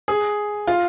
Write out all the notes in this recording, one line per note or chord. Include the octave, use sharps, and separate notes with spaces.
G#4
F4